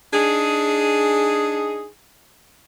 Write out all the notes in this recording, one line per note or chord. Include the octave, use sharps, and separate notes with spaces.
D4 D#4 G#4